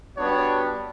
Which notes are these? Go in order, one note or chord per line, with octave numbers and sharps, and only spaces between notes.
G3 B3 D4 F#4 C#5